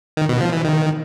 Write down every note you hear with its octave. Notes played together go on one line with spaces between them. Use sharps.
D#3
B2
F3
E3
D#3